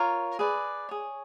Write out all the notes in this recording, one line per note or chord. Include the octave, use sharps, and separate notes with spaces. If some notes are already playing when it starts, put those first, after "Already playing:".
Already playing: F4 A#4 C#5
G#4 B4 D5
G#4 C#5